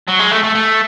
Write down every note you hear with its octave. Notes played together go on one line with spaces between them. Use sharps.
F#3
G#3
A3
A3
A3